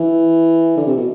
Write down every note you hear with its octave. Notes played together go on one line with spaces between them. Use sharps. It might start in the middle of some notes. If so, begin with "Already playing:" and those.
Already playing: E3
D3
C3
B2